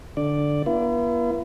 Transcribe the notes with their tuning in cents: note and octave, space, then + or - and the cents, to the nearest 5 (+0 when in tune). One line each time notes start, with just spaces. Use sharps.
D3 +0 D5 +0
B3 -45 E4 +40